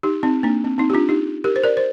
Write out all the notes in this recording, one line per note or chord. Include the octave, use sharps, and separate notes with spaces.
D#4 G4
C4 D#4
A#3 D4
C4
C4 D#4
G4
D4 F4
D#4 G4
G4 A#4
C5
A#4 D5
C5